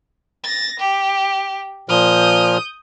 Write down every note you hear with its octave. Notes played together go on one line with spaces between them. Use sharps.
A6 A#6
G4
A#2 F3 D#6 F6 G6